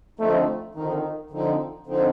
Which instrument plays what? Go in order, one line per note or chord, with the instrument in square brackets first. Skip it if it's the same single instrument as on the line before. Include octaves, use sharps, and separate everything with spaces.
[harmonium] D3 F3 C4 D#4 [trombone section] A3
[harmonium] D3 F3 C4 D#4 [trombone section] D#3
[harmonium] D3 F3 C4 D#4
D3 F3 C4 D#4